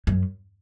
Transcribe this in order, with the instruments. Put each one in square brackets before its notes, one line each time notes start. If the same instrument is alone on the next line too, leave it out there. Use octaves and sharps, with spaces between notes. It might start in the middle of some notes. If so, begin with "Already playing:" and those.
[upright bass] F#2